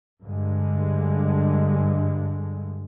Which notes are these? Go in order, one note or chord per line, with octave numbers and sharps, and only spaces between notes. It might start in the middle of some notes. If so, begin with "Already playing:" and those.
G2 D3 G#3